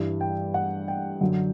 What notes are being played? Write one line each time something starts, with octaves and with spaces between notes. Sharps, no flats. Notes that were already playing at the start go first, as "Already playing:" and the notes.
Already playing: G2 E3 G3
G5
F#5
G5
F#2 D3 F#3